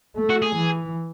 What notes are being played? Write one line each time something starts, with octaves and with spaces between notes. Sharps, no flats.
A3
F#4
G#4
E3